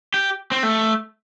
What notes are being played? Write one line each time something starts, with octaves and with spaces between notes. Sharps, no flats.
G4
C4
A3